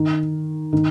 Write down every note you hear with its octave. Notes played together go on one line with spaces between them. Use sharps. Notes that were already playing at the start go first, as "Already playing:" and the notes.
Already playing: D#3
D#3